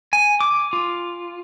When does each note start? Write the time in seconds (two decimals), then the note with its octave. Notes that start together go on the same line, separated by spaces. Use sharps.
0.13 G#5
0.40 D6
0.73 F4